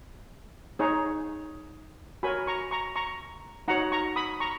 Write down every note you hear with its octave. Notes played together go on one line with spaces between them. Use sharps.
D#4 G#4 C#5
F#4 A#4 C#5 G#5 B5
A#5 C#6
A#5 C#6
A#5 C#6
D#4 F#4 C#5 F#5 A#5
A#5 C#6
B5 D#6
A#5 C#6